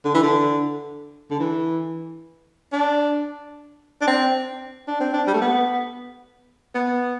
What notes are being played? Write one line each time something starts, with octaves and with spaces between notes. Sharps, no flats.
D3
E3
D3
D3
E3
D4
D4
C4
D4
C4
D4
G3
A3
B3
B3